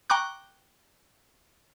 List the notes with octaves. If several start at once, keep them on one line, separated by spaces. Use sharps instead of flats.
G5 A#5 C#6 D6 F#6